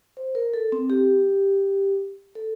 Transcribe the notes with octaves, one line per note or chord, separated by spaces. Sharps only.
C5
A#4
A4
C4
G4
A4